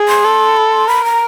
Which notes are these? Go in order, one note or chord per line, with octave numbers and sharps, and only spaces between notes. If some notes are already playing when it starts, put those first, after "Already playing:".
Already playing: G#4
C6
A4
B5
C6
A#4 B5
A#5